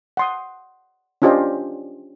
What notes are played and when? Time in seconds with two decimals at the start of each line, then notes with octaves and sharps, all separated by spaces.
0.17 F#5 C6 D#6
1.22 C#4 D4 F4 G4 C5 D#5